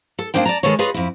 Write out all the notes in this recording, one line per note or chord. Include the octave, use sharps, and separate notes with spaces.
A4
A#3 D4 D#4 C5 G5
D5 A5 A#5
D#3 G#3 A4 B4 C#5
F4 G#4 B4 C#5 D#5 A#5
F2 E4